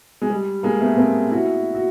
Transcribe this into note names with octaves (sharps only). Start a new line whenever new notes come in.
G#3
G3
G#3 A#3
A3 B3
A#3 C4
E4 F#4
F#4